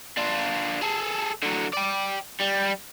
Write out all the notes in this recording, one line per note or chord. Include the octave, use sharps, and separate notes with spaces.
D4 F4
G#4 A4
D3 F#3
D5 G5
G3